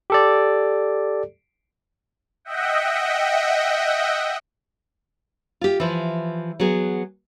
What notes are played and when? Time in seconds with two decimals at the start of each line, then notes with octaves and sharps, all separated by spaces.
0.10 G4 A4 D5
2.45 D#5 E5 F#5 G5
5.61 F4 G4
5.80 E3 F3
6.60 F#3 B3 G#4